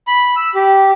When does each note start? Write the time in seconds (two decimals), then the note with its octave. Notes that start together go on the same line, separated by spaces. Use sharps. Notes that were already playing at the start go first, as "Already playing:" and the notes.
0.08 B5
0.36 E6
0.55 G4